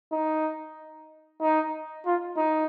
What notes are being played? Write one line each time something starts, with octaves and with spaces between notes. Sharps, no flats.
D#4
D#4
F4
D#4